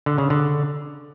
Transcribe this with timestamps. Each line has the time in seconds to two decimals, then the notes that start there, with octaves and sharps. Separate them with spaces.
0.06 D3
0.18 C#3
0.30 D3